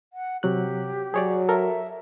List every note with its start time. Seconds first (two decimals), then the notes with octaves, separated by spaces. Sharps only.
0.13 F#5
0.43 C3 F#3 G4 F#6
1.14 F#3 G#4 C#5 D5
1.49 A4 A#4 E5